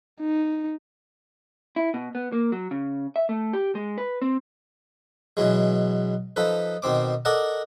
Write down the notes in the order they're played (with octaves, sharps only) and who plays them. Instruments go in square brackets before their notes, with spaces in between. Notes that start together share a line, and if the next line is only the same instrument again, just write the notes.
[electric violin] D#4
[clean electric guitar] E4
B2
B3
A#3
F#3
C#3
E5
A3
G4
G#3
B4
C4
[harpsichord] B2 E3 F#3 G#3
F3 D#4 A4 B4
B2 D#3 C4 D6
A4 A#4 D5 D#5 F#5